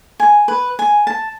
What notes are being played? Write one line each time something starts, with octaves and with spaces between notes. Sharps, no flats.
G#5
B4
G#5
A5